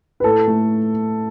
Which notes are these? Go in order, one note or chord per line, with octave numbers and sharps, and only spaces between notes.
B4
A2 A4
A3